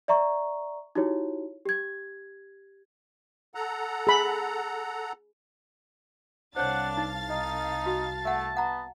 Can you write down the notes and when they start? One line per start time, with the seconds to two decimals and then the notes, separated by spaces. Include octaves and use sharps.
0.08 D5 E5 A#5 C#6
0.95 D#4 E4 F#4 G4 C#5
1.66 G4 G#6
3.55 A4 F#5 A#5
4.07 G#4 B5
6.56 C2 D4 C5 C#5 F5 F#5 A6
6.97 D#4 A5
7.30 D#4 D#5
7.86 F#4
8.25 A3 E5 F#5
8.57 B3 F#5 A#5